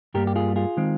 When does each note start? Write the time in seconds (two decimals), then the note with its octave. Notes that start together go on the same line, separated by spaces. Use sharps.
0.14 G2 G3 A#3 G4 A#4
0.27 G4
0.36 F4 G#4
0.56 F4 G#4
0.77 D#3 G#3 C4